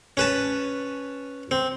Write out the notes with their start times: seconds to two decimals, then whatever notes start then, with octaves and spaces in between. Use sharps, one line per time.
0.17 C#4 B4 A5
1.51 C4